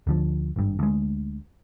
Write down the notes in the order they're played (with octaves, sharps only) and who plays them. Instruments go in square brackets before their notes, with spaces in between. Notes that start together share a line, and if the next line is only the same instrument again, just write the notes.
[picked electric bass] D2 D3 F3
G#1 G2
D2 G#3